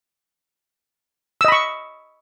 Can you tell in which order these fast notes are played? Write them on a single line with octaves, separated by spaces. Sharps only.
E6 D#5 B5 C#6